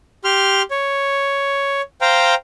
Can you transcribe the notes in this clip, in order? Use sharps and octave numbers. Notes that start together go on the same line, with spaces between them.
G4 C6 F6
C#5
C5 F5 G5 A#5